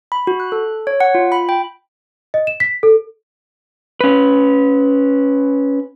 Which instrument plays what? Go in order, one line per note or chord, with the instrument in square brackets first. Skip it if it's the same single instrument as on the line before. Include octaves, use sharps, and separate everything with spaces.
[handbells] B5
F#4
F#6
A4
C#5
F#5
F4
B5
G5
[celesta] D#5
E7
B6
A4
[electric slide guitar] C#4 B4